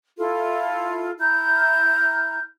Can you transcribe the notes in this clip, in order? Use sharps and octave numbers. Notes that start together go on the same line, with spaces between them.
E4 F4 A4
E4 A#5 F6 G6